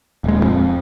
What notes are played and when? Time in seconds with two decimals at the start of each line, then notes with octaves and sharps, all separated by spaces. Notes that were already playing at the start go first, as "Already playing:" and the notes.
0.24 D#1 G#3
0.43 F2